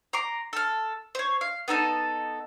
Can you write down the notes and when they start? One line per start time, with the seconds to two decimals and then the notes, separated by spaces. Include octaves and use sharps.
0.13 A#5 C6 D6
0.53 A4 F6
1.15 C5 C#5
1.41 F5
1.68 B3 D#4 A4 A5